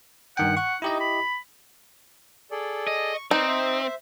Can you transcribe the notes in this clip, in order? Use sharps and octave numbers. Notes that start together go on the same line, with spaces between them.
G2 D#3 F#5 G5
F#5 C#6
D#4 E4 G4 D#5
B5
G#4 A4 D5
D#5
C#6
C4 D#4 B4 D5
C5 E5